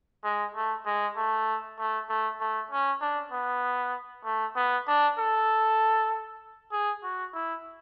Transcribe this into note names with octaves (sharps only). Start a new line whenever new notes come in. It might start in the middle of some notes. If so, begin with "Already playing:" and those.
G#3
A3
G#3
A3
A3
A3
A3
C#4
D4
B3
A3
B3
D4
A4
G#4
F#4
E4